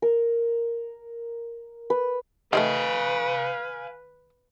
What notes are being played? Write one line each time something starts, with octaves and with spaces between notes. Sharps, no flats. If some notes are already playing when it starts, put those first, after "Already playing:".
A#4
B4
D#3 G#3 A3 B4 F5 G#5